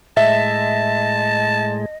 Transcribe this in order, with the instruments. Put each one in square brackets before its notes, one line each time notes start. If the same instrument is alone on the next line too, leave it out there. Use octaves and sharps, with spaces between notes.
[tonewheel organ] A2 G#3 [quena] D#5 [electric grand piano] E5 [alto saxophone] A5